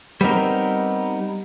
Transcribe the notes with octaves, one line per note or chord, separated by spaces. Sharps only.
G3 B3 C4 D#4 A#4